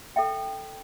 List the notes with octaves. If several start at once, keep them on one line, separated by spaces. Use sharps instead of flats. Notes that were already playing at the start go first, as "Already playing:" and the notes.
A4 E5 G5